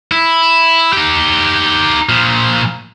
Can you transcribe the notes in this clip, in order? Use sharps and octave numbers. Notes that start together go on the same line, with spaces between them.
E4
D#4 G4
A#2 F3